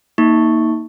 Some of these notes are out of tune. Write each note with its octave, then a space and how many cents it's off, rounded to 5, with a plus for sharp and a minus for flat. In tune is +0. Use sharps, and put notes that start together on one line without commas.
A#3 +0 D#4 +20 C#6 +0